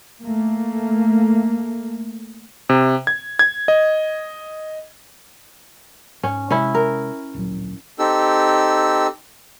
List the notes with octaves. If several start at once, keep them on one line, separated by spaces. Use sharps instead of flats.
A3 A#3
C3
G#6
G#6
D#5
G#2 C#4
C3 G#3 C#4 E4
A#4
D1 A#1 F#3
C4 D#4 G4 A4 E6